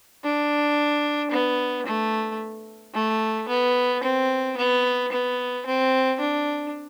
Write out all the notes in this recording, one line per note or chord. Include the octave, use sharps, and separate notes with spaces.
D4
B3
A3
A3
B3
C4
B3
B3
C4
D4